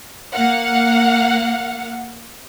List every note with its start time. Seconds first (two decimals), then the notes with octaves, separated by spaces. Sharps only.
0.34 A#3 F5 F#5